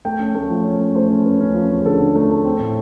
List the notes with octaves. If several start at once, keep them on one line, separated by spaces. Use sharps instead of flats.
A3 G5
C#4
A3
F3
C#4 C#5
A3
A3 C5
C#4
C#4 B4
C#4
F3
C#4
G#4
D3 A4
D3
A3
A3
C4
A2